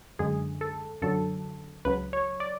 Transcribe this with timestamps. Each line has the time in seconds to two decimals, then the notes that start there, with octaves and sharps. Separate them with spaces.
0.19 F#2 D3 G#3 G#4
0.61 A4
1.02 F#2 D3 F#3 A4
1.85 C#2 C#3 F#3 B4
2.13 C#5
2.40 D5